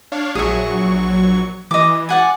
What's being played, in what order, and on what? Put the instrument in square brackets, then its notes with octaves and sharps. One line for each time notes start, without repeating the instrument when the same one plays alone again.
[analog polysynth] D4 C#5 F5
[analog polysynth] A#1 F#3 C#6 [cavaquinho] G#4 E5
[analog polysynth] E3 [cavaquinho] D#5 D6
[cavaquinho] D5 F#5 G#5